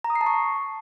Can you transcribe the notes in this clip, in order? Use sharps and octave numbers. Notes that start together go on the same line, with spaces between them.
A#5
D#6
C7
A5
C#6